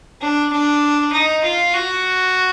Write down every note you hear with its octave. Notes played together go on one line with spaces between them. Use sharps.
D4
D4
D#4
F4
F#4